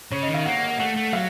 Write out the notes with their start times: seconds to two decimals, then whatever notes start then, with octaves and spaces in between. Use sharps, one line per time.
0.11 C#3 C#5
0.23 D#5
0.28 D#3
0.34 F5
0.46 A#3 F#5
0.57 F#5
0.68 F#5
0.80 A3 F#5
0.96 A3
1.13 F#3 F5